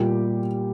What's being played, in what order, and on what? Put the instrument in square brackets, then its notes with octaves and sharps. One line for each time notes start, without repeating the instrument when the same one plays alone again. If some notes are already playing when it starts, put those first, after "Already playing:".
Already playing: [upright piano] A#2 G3 G4